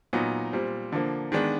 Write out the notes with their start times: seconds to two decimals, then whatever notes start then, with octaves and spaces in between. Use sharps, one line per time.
0.13 A#2 F#3 B3 D#4
0.52 A#2 G3 C4
0.92 D3 F3 A#3
1.32 D#3 G#3 B3 D4